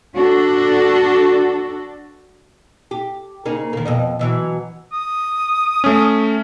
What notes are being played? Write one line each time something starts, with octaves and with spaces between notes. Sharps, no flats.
D4 F#4 A4
G4
C#3 A#3 D#4
D#3 A#3
F2 B2 D#5
B2 E3 F#3
D#6
A3 C#4